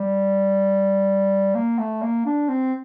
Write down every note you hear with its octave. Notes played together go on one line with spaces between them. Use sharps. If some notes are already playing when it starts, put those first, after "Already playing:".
Already playing: G3
A#3
A3
A#3
D4
C4